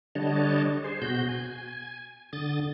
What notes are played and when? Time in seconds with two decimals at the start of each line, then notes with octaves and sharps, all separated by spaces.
0.15 D3 G3 D4 C#5 D#5 A5
0.84 G#4 C5
1.02 B2 F#4 G6
1.29 G#5
2.33 D3 D#6 A6